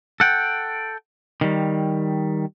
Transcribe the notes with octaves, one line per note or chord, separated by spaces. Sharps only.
A4 F#5 G5
D#3 G3